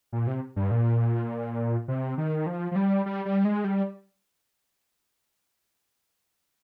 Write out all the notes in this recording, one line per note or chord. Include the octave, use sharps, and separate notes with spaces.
A#2
C3
G2
A#2
C3
D#3
F3
F3
G3
G3
G3
G#3
G3